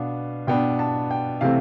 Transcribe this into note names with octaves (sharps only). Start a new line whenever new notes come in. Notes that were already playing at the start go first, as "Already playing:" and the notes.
Already playing: B2 B3 D4 F5
B2 B3 D4 G5
A5
G5
C3 E3 A3 C4 F5